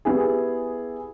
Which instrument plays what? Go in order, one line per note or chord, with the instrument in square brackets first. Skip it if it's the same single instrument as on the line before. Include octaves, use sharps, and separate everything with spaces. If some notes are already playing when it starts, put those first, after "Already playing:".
[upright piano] B3 E4 G4 G#4